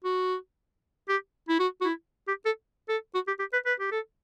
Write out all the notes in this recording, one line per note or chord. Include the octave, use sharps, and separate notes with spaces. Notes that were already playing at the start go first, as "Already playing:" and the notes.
F#4
G4
E4
F#4
F#4
E4
G4
A4
A4
F#4
G4
G4
B4
B4
G4
A4